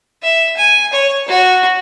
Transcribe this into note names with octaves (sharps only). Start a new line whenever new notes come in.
E5
G#5
C#5
F#4